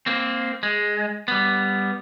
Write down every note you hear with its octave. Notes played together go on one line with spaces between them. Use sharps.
A#3 C4
G#3
G3 B3